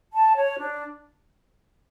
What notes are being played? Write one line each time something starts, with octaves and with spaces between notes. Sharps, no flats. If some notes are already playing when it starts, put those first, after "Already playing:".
A5
C#5
D4